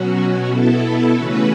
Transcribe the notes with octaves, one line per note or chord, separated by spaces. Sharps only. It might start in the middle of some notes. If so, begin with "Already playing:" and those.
Already playing: B2 F#3 C#4 F#4
B2 B3 E4 A4
E4 A4
C#3 E3 A3 C#4 F#4 B4